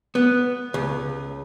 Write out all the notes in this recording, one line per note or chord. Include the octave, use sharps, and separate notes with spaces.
B3
C#2